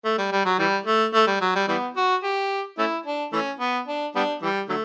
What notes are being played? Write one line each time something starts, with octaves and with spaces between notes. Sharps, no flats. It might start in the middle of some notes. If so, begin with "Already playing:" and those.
A3
G3
G3
F#3
E3 G3
A3
A3
G3
F#3
G3
E3 G3 B3
F#4
G4
A3 C#4 E4
D4
E3 A3 C#4
B3
D4
G3 B3 D4
E3 G3
D3 F#3 A3